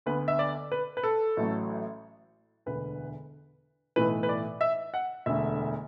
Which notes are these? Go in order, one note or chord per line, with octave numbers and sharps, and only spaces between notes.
D2 D3 B3 B4
E5
D5
B4
B4
A4
A1 A2 F#3 A3
E1 D2 D3 B4
B1 A2 E3 A3 B4
B4
D5
E5
F#5
E1 D2 D3 A3 E5